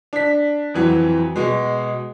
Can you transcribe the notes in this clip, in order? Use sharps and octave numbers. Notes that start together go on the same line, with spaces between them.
D4 B6
F2 E3 F#3
B2 G#3